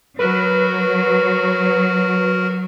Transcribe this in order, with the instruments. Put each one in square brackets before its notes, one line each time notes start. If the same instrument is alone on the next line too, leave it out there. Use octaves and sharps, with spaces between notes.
[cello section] F#3 [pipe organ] F#4 A#4 [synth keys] B4